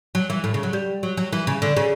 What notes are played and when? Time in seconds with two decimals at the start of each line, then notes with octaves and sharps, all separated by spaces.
0.15 F#3
0.30 E3
0.44 A2
0.54 C#3
0.63 F#3
0.73 G3
1.03 F#3
1.17 F#3
1.33 E3
1.47 C#3
1.62 D3
1.77 C#3